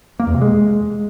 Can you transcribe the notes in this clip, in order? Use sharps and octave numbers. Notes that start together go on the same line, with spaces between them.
A#3
E2
C3
G#3